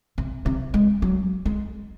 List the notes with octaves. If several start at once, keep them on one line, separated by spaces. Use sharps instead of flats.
C3
C3
G#3
F#3
G#3